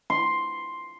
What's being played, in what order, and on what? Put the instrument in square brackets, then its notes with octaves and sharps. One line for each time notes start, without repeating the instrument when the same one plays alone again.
[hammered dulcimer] C6